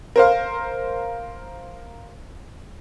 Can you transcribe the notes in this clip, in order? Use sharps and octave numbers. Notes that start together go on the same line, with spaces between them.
A#4 C5 F5